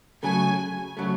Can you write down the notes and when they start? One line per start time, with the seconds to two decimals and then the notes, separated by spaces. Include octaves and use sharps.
0.23 C#3 F#3 A3 G#5
0.97 C#3 F#3 A3